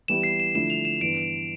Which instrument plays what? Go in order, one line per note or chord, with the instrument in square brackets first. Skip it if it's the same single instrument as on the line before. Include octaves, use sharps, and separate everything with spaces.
[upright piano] E3 G3 B3 E4 G4 [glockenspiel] E7
[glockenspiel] C7
E7
[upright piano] D3 F3 A3 E4 [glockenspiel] E7
[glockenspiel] F7
E7
[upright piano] G2 E3 B3 [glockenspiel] D7